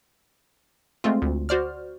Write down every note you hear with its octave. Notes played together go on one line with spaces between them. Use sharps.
G#3 A3 C4 F4
D2
F#4 C5 D5 F6